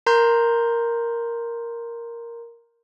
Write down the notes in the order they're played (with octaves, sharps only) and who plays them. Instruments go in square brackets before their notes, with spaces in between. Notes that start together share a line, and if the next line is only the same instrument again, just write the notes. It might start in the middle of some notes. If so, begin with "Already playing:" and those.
[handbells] A#4 A#5 C6 G6